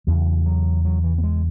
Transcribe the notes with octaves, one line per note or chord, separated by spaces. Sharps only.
E2 C#3 F#3
F#3
F#3
E3
B3
G#3